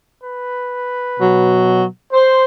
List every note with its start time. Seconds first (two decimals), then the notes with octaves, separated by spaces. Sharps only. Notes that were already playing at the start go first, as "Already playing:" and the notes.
0.24 B4
1.17 B2 F#3
2.12 C5